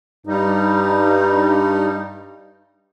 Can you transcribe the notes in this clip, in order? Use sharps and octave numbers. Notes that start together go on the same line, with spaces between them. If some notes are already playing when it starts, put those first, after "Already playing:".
G2 G3 D#4